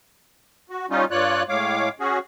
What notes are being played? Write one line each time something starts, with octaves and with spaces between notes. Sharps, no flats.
F#4
G3 C#4 D#4 F4
G2 F4 C#5 D5 F#6
A2 G#3 C#5 F5 D6
C#4 F#4 G#4